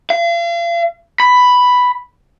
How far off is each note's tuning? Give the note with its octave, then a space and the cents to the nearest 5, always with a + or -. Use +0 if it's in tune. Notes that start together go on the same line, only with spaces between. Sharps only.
F5 -40
B5 +5